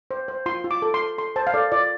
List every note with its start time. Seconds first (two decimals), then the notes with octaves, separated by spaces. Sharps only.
0.11 C5
0.28 C5
0.46 F4 C6
0.64 F4
0.71 D6
0.82 A4
0.94 C6
1.00 A4
1.18 A4 C6
1.36 C5 A5
1.47 F5
1.54 A4 D5
1.72 F4 D5